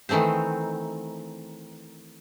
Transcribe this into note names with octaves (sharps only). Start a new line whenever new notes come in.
D#3 E3 A3 C4 C5